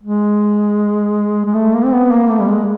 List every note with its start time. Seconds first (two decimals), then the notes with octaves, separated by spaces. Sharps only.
0.03 G#3
1.45 G#3
1.54 A3
1.74 A#3
1.85 C4
1.92 B3
2.12 A#3
2.30 A3
2.40 G3
2.49 G#3